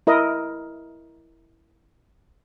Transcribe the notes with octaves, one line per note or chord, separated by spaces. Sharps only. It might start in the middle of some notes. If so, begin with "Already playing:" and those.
E4 A#4 D#5